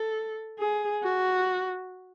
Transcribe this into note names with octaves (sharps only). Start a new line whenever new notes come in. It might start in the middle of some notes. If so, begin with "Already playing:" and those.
Already playing: A4
G#4
F#4